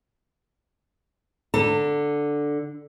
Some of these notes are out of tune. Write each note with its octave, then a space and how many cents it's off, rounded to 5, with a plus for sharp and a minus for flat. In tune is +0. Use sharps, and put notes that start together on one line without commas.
D3 +0 A5 +35